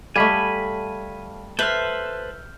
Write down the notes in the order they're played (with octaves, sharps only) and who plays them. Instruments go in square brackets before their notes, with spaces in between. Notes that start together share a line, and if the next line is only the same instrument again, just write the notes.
[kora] G3 A3 [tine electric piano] A4 F5 [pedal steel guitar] G#5 B5
[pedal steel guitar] A4 B4 C5 [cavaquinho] E5 [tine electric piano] F6 G6